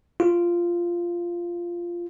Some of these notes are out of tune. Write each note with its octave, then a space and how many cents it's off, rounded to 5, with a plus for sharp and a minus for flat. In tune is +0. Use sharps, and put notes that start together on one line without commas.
F4 -10